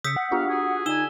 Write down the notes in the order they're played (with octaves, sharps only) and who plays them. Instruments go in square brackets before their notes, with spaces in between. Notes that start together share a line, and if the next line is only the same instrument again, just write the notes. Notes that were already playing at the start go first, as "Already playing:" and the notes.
[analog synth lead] C#3 [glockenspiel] D#6 E6 B6 [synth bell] G6 C#7
[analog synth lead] F#5
[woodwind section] G3 B3 F5 [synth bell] D4 F4 G4
[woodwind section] F#4 G#4
[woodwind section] D3 G#5 [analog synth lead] D#4 [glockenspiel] E6 E7 G7